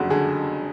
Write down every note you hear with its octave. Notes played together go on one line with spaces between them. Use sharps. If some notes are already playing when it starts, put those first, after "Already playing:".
Already playing: F#1 F2 D3 G#3 F#4
D3 G#4